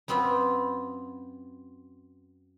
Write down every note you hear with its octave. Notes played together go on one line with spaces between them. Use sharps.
F#2 B3 C4 F4 E5